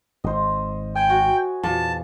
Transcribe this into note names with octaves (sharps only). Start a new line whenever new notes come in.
G#1 C5 D#5
G5 G#5
F#4
E2 A#2 A5